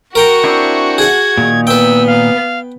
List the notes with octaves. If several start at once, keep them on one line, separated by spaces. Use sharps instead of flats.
F#4 A#4 G5 A#5 C#6
C4 D4 E4
G#4 F#5 G#6
A#2 D#3
B3 B4 G5 E6
F5